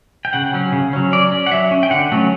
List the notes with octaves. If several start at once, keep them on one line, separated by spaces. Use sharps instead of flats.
G5
C#3 F#5
F#3 C#4
C#3
F#3 C#4
F#3 D5
C#4
F#5
F#3 E5
C#4
G5
D3 F#5
F#3 A3 C#4